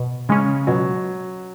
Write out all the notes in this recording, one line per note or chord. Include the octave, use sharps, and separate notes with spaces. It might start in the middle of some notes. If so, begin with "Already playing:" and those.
Already playing: B2
C#3 G#3 C#4
B2 F#3